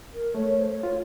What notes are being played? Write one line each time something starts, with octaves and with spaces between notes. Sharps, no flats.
A#4
A3 C#5
C5
C#5
F4